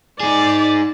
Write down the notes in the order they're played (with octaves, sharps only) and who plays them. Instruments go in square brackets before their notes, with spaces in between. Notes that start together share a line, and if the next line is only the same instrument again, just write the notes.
[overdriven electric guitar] D#4 G#4 [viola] D5